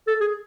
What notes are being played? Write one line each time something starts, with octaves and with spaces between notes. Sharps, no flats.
A4
G#4